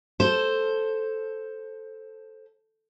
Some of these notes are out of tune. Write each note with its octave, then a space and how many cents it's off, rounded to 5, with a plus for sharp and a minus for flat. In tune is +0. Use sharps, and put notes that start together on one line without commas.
A4 +0 C5 +5